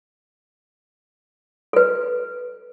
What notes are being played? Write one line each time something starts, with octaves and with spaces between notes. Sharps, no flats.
A4 B4